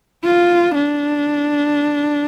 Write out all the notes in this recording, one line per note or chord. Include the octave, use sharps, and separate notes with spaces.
F4
D4